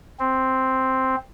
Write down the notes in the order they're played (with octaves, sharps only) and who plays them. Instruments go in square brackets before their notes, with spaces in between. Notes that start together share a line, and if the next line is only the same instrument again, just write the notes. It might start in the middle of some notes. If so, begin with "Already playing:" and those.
[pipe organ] C4